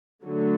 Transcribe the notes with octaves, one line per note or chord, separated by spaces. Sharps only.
D3 F#3 A3